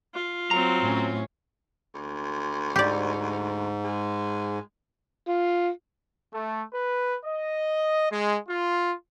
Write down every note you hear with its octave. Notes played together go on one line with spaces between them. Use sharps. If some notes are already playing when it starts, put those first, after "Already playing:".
F4
F#3 C4 A#5
A2 C#4
D2
G#2 G4 D5
G#3
F4
A3
B4
D#5
G#3
F4